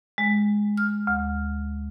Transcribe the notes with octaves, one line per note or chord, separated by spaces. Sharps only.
G#3
F6
D2